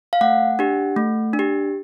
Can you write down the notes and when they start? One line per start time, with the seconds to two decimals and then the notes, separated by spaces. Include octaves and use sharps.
0.13 F5
0.21 A3 F#5
0.59 D4 G4
0.96 A3
1.33 D4
1.39 G4